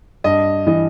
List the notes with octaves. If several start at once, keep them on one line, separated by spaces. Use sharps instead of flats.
G2 D#5
E3 D#5